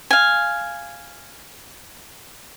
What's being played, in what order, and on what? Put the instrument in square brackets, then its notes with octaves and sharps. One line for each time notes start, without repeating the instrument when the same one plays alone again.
[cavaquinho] F5 G#5